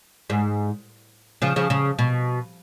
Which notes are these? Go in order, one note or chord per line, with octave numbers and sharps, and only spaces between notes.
G#2
C#3 F3
C#3 F3
C#3
B2